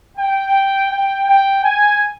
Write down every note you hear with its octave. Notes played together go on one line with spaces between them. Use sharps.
G5
G5
G5
G#5